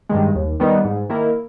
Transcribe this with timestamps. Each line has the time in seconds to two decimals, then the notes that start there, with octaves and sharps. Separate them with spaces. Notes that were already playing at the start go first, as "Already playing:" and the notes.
0.09 G2 D#3 G#3
0.35 D#2
0.60 D#3 G3 B3 D#4
0.84 G#2
1.09 D#3 A#3 E4 A#4